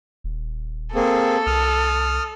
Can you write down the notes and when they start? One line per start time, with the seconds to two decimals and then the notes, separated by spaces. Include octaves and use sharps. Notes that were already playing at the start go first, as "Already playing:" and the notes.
0.24 D#1
0.95 A#3 C4 G#4 A4
1.46 C2 D#6 F6